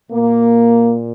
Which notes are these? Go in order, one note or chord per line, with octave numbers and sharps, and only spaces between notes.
A#2 A#3